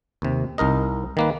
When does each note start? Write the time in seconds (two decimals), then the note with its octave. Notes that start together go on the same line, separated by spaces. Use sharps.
0.22 D#2 C3
0.58 C2 D#4 A#4 D#5
1.17 D#3 A#3 B4